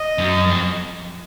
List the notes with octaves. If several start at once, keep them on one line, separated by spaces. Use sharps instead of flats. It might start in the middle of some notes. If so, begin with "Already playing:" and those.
Already playing: D#5
F#2
F2